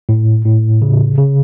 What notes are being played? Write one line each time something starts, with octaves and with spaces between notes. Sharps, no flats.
A2
A2
C#3
C#3